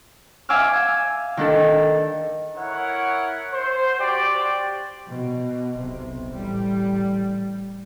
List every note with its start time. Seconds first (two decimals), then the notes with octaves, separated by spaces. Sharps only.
0.49 E5 F5 G#5 D6 E6 F6
1.37 D#3 D4 A4
2.57 E4 A#4 C#5 F#5
3.53 C5
3.99 F#4 G4 C5 D5 G5
5.07 B2
5.75 D1 B1 C3
6.33 A1 G3